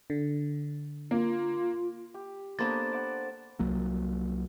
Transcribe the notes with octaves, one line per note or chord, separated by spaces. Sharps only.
D3
A#3 F4
G4
A#3 B3 D4 A4 C5 A5 A6
F#5 D6
C2 F#3 A#3